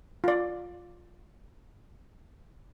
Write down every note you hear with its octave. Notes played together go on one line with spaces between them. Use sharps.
F4 D5